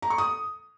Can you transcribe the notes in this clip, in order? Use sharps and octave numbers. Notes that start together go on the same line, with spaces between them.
A#5
C#6
D#6